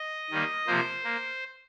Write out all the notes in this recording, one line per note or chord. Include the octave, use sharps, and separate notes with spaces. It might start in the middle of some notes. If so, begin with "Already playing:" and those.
Already playing: D#5
D#3 G3 A#3
C3 F3 A#3 C5
A#3